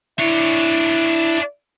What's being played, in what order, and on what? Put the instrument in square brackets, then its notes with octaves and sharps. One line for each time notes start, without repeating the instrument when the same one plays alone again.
[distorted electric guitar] D4 C#5 [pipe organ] E4